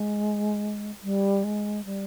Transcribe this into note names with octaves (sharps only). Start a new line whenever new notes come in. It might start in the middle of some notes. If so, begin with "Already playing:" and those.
Already playing: G#3
G3
G#3
G3